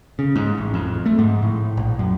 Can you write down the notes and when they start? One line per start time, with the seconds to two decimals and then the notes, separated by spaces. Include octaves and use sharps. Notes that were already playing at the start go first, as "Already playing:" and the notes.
0.19 C#3
0.36 G#2
0.58 A1
0.74 F2
1.06 A3
1.19 G#2
1.43 A2
1.77 A#1
1.99 F#2